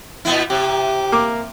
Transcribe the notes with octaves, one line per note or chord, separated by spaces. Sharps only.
A#2 B3 E4
C3 G4
A#3 D6